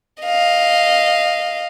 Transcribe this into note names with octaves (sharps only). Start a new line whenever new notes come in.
D#5 F5